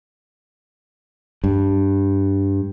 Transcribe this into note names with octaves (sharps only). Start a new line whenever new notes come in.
G2